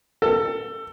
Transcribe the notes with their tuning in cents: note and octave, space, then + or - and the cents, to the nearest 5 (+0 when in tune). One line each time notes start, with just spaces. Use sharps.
A4 +20